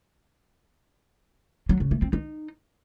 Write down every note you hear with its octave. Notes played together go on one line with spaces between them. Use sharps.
F#3
C#3
A3
C4
D#4